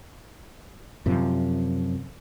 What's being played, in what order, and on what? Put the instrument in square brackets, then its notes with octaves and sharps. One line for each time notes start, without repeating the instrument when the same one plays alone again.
[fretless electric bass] F#2 C3 F3